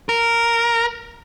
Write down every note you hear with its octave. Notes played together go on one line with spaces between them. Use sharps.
A#4